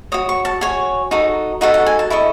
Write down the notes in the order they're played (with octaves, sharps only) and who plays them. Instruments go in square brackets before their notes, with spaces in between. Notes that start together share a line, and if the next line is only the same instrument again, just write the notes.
[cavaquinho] F#4 C#5 D#6
C#6
A5
F#4 C#5 G#5
D#4 F#4 A4
D#4 F#4 A4 F#5
F#5
G#5
A5
E4 A4 D#5 C#6